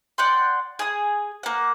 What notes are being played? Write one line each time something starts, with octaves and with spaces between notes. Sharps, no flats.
D5 F#5 G5 C6
G#4 D#6
A#3 F#5